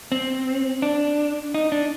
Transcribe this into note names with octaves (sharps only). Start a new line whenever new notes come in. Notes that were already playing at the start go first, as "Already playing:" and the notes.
C4
D4
D#4
D4